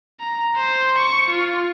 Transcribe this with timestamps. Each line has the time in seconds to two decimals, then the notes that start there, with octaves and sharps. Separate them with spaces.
0.20 A#5
0.56 C5
0.98 C#6
1.29 F4